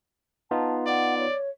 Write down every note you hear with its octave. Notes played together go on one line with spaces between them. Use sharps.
B3 D#4 F4 A5
D5 F#5
C#5